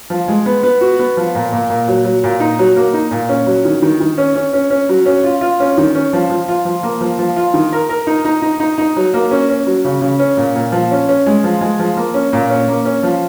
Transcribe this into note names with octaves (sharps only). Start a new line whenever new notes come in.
F3
G#3
B3
B3
F#4
B3
F3
A#2
A#2
A#2
F#3
F#3
A#2
D#4
F#3
A#3
D#4
A#2
C#4
F#3
D#3
D#3
D#3
C#4
C#4
C#4
C#4
F#3
C#4
F4
F4
C#4
D#3
C#4
F3
F3
F4
F3
A#3
F3
F3
F4
D#3
A#4
A#4
D#4
D#4
D#4
D#4
D#4
F#3
A#3
C#4
C#4
F#3
C#3
C#3
C#4
A#2
A#2
F3
C#4
C#4
G#3
F3
G#3
F3
A#3
C#4
A#2
C#4
A#3
C#4
F3